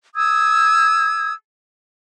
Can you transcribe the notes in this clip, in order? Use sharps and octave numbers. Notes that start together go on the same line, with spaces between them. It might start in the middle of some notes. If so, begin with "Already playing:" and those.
D#6 E6 G#6